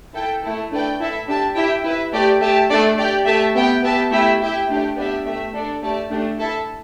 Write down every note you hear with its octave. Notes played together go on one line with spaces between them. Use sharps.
E4 A4 G5
A3 E4 A4
A3 D4 B4 D5 G5
E4 A4 E5
D4 G4 E5 A5
E4 G4 E5 G5
E4 B4 E5
A3 G4 D5
A3 G4 E5 A5
A3 D4 A4 D5
G4 D5 G5
A3 G4 E5 A5
B3 G4 E5 G5
B3 G4 E5 A5
A3 E4 G4 E5 G5
E4 G4 E5 G5
A3 D4 G4
B3 D4 G4 E5
A3 G4 E5
D4 A4 D5
A3 G4 D5 A5
A3 D4 G4
E4 A4 E5 A5